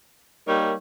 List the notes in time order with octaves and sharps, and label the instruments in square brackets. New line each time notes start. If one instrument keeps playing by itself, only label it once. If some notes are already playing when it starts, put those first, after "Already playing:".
[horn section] G3 A#3 D#4 A#4 C#5